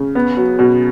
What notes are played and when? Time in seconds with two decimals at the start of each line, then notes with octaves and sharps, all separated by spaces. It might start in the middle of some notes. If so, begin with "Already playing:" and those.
Already playing: C#3
0.15 B3
0.37 F#3
0.59 B2